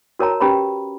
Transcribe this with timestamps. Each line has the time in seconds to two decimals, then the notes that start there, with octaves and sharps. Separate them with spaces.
0.19 F#4 A#4 C#5 A5 A#5
0.40 C#4 G4 B4 A#5 B5